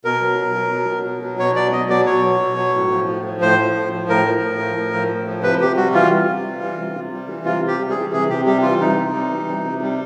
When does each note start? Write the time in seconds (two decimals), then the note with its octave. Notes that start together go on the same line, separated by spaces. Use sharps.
0.05 B2 A#4
0.21 F#3
0.39 B2
0.55 F#3
0.72 B2
0.89 F#3
1.05 B2
1.23 F#3
1.39 B2 C#5
1.56 F#3 D5
1.72 B2 D#5
1.89 F#3 D5
2.06 B2 C#5
2.24 F#3
2.40 B2
2.57 F#3
2.75 A2
2.91 F3
3.08 A2
3.24 F3
3.41 A2 C5
3.58 F3
3.75 A2
3.92 F3
4.08 A2 A#4
4.25 F3
4.42 A2
4.59 F3
4.77 A2
4.93 F3
5.10 A2
5.27 F3
5.43 C3 B4
5.61 C3 G4
5.76 G3 F#4
5.94 E3 F4
6.11 C3
6.27 C3
6.44 G3
6.62 E3
6.78 C3
6.95 C3
7.11 G3
7.29 E3
7.45 C3 F4
7.61 C3
7.67 G4
7.79 G3
7.90 E3 G#4
8.13 C3 G#4
8.29 C3 G4
8.46 G3 G4
8.62 E3 F4
8.79 C3 D#4
8.96 C3
9.13 G3
9.30 E3
9.47 C3
9.64 C3
9.81 G3